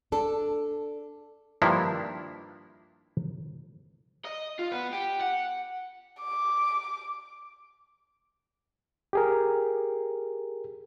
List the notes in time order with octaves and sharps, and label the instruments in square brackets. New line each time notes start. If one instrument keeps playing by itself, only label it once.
[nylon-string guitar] D4 A4
[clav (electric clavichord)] G2 D#3 F3 A#3 D4 E4
[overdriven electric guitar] D#5
F4
B3
G4
F#5
[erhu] D6
[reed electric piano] G4 G#4 A#4